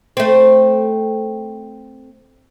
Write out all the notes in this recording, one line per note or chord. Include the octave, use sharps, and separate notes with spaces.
A3 C4